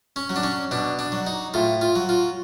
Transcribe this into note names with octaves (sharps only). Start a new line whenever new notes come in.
C#4
F#3
D4
C#4
B2 D4
D4
F#3
D#4
A2 F4
F4
F#3
F4